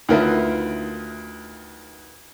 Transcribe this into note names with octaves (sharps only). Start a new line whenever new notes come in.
D2 D#3 F4 A#4 B4 E5